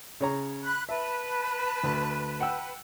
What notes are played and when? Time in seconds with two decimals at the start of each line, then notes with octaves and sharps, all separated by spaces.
0.21 C#3 C#5 A#5
0.63 B5 F#6
0.89 B4 E5 A5
1.83 D2
2.40 F#5 G5 E6